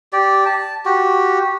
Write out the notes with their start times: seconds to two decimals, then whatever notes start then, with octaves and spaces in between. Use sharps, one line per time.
0.13 G4 D5
0.46 A5
0.85 F#4 G4